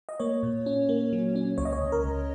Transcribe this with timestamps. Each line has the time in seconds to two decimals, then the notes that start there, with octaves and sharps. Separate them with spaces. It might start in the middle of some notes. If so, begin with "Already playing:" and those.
0.09 D#5
0.19 A#3 C#5
0.43 A#2
0.66 C#4
0.89 A#3
1.13 F#3
1.36 C#4
1.58 C#2 C#5
1.65 D#5
1.73 C#5
1.81 C#2
1.92 A#4
2.04 C#2